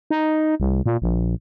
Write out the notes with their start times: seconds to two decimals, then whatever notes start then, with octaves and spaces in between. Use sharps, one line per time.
0.11 D#4
0.60 C2
0.86 A#2
1.02 A#1